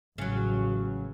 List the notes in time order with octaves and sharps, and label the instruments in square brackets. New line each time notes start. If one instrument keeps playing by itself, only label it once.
[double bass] A1 [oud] C#3 F#3